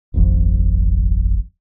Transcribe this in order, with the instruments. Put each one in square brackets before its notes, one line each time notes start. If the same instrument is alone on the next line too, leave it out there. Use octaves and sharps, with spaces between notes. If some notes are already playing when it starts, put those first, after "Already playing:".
[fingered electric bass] D1 G#1 F2